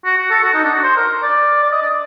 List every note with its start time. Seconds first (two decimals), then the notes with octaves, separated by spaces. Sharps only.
0.05 F#4
0.18 F#4
0.30 A4
0.44 F#4
0.54 D#4
0.63 D4
0.74 F#4
0.83 C5
0.97 A#4
1.23 D5
1.63 D5
1.72 D#5
1.82 D5